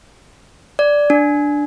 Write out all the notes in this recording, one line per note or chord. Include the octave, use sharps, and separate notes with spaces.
D5
D4